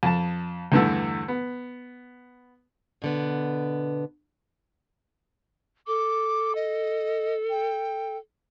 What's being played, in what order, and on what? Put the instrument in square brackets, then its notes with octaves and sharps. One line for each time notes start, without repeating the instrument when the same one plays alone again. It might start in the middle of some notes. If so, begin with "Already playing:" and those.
[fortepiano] F2 A5
E2 G2 D3 E3 A3
B3
[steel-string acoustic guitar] B2 D3 B3
[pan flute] A4 [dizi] D6
[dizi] D#5
G5